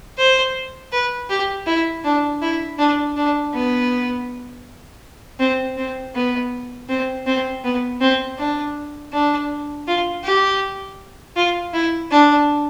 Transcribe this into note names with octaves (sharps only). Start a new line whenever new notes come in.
C5
B4
G4
E4
D4
E4
D4
D4
B3
C4
C4
B3
C4
C4
B3
C4
D4
D4
F4
G4
F4
E4
D4